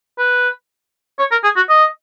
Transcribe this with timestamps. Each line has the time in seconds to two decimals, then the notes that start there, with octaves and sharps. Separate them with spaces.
0.18 B4
1.19 C#5
1.31 A#4
1.44 G#4
1.56 F#4
1.69 D#5